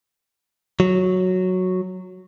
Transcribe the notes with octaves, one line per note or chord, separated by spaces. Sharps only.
F#3